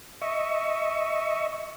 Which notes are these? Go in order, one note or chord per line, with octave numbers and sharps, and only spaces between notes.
D#5 E5 C#6